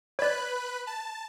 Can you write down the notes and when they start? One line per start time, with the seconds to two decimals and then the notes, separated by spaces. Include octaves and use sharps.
0.19 B4 C#5 D5 B5 F#6
0.87 A5